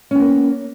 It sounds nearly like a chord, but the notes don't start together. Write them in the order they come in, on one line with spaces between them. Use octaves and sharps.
C#4 B3 A#3